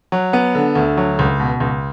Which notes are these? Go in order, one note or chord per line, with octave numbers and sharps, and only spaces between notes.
F#3
B3
D3
D2
F#3
C#2
B2
C#2